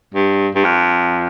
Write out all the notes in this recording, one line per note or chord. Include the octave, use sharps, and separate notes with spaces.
G2
G2
F2